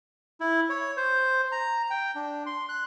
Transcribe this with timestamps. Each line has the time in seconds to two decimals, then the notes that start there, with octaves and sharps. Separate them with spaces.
0.40 E4
0.70 C#5
0.97 C5
1.52 A#5
1.90 G5
2.15 D4
2.46 C6
2.69 F#6